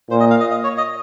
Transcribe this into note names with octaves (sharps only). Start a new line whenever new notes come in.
A#2 C5
D#5
F5
D#5
D#5
C#5
D#5